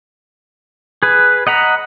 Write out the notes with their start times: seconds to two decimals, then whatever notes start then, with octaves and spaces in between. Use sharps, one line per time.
1.03 G#4 B4
1.47 D#5 F#5 A#5 B5